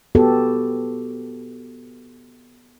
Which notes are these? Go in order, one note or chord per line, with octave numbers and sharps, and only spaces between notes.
B3 F#4 G4 A4